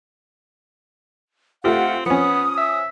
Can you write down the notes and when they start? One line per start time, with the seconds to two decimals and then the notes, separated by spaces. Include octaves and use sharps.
1.64 A3 C4 F4 G4 F#5
2.06 F3 B3 C#4 D#6
2.57 E5